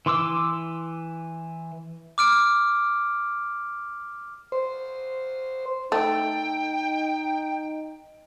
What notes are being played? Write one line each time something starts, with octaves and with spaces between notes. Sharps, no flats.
E3 C6 D6 E6
D6 F6 D7
C5
A3 D#4 G5